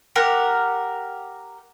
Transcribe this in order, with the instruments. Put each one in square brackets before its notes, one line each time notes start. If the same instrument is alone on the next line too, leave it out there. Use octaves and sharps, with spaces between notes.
[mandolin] G4 A#4 F#5